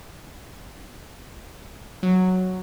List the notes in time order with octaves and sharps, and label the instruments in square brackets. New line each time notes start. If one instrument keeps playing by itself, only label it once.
[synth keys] F#3